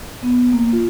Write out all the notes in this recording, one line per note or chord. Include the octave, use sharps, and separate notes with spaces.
B3
A#3
F4